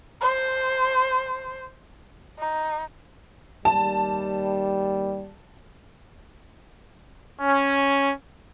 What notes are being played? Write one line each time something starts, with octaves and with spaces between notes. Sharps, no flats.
C5
D#4
D#2 G3 A5
C#4